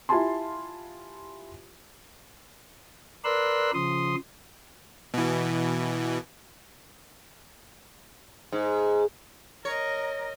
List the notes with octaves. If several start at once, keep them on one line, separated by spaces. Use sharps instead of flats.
E4 F4 G4 G#5 A5 C6
A#4 B4 D5 C6 E6 F#6
C#3 F3 C6 D#6
B2 E3
G#2
A#4 C#5 D#5